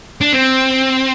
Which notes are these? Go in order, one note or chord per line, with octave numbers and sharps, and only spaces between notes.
D4
C4